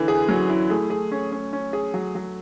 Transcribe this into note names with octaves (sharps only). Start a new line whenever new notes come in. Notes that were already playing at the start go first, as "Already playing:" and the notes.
Already playing: D3 E3
G#4
F#3 C#4
E4
A3 G#4
G#4
C#4
C#4
C#4
G#4
F#3
F#3